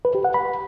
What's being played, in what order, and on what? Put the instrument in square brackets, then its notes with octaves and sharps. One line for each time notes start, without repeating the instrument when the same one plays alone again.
[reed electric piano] B4
G4
F#5
B5